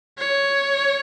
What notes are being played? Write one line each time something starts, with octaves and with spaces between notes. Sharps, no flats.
C#5